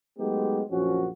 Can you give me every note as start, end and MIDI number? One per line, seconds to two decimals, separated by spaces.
0.18 0.62 54
0.18 0.62 56
0.18 0.62 57
0.18 0.62 59
0.18 0.62 63
0.18 0.62 67
0.70 1.07 34
0.70 1.07 42
0.70 1.07 53
0.70 1.07 61
0.70 1.07 66